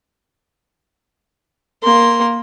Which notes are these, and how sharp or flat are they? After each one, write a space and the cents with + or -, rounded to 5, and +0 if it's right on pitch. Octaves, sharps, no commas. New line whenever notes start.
A#3 +0 C6 +5